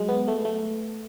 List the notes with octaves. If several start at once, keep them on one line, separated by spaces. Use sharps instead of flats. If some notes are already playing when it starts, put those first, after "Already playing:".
Already playing: F#3 G#3
B3
A3
A3